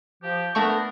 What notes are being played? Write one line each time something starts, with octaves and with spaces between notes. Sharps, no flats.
F3 G4
A3 B3 D4 A#4 C#6